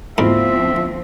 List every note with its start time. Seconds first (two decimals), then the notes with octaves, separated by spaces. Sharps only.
0.18 D2 G#2 F3 B3 C4 E4 F4 E5